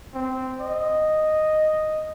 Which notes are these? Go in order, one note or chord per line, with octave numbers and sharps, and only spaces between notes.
C4
D#5